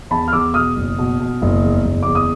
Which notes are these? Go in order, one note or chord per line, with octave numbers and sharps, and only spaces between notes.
E2 A5 B5
F6
E2 D6 E6
B2 D#6 F6
F#1
B2
B2
F#1
E2
F#1
E2 D6
D#6